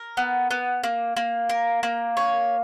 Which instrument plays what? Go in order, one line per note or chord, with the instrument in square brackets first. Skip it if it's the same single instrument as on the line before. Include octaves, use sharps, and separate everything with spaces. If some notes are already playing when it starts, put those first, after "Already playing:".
Already playing: [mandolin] A#4
B3
B3
A#3
A#3
A#4
A#3
C#5